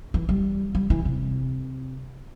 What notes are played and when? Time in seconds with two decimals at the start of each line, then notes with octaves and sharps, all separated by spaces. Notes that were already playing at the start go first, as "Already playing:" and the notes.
0.14 E3
0.29 G3
0.75 G3
0.90 E3
1.05 C3